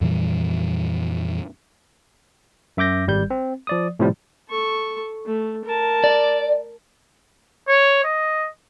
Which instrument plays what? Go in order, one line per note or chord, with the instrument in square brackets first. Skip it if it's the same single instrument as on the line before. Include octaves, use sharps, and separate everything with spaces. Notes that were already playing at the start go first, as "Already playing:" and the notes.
[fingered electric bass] F2 A#2 E3 G3
[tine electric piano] F#2 E5 D6 G6 A#6
G#1 G3 G6
C4
F3 D5 D#6
A2 C3 F3 G3
[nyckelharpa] A4 C#6
A3
A#4 A5
[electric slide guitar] D5
[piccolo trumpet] C#5
D#5